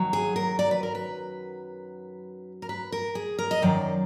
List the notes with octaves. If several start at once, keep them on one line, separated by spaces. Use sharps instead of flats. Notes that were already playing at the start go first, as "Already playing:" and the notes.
Already playing: F#2 D#3 F#3
G#4
A#4
D5
B4
A#4
B4
A#4
B4
A#4
G#4
A#4
D#5
F#2 D#3 F#3 D5